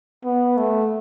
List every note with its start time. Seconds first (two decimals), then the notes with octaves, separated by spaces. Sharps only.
0.24 B3
0.57 A3